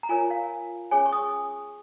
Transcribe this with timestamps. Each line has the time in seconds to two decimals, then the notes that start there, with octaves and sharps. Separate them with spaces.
0.03 A#5
0.09 F4 A#4 C#5 G#5
0.31 F5
0.91 C#4 G#4 C#5 G#5
1.06 C#6
1.12 D#6